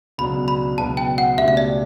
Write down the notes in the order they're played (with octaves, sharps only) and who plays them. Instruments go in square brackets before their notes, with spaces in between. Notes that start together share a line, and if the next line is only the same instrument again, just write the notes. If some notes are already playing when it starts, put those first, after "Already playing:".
[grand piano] C#2 B2 F#3 B3 D4 [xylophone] B5
[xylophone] B5
[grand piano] C#2 B2 F#3 B3 D4 [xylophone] A5
[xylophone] G5
F#5
[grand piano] C#2 B2 A3 D4 G4 [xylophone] E5
[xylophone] E5
D5